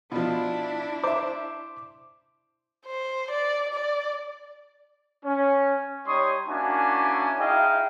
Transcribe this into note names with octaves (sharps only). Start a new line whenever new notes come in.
B2 F3 D4 E4
C5 E5 D6
C5
D5
D5
C#4
G3 D#4 C#5 C6 C#6 D#6
A#3 C#4 D4 E4 F#4 G#5
D#4 E4 G#4 D#5 F5 G5